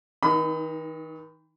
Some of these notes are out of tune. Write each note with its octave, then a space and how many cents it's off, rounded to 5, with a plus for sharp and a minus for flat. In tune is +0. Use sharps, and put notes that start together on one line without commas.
D#3 +45 D#4 +0 B5 +35